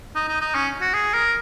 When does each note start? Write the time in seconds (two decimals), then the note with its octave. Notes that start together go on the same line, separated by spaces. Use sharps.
0.15 D#4
0.28 D#4
0.41 D#4
0.55 C#4
0.81 F#4
0.94 G#4
1.14 A#4